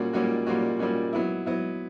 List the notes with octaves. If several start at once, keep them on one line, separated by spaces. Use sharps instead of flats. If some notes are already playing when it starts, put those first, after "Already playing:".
Already playing: A#2 G3 A#3 C#4 F#4
A#2 G3 A#3 C#4 F#4
A#2 G3 A#3 C#4 F#4
A#2 G3 A#3 C#4 F#4
F#3 B3 E4
F#3 B3 E4